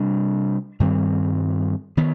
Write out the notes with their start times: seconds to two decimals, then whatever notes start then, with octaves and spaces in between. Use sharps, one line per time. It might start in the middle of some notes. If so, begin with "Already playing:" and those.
Already playing: C3 G3 D4
0.80 G2 D#3 G3 C4
1.97 D#3 B3